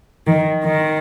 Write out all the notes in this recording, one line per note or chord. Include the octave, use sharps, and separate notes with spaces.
D#3
D#3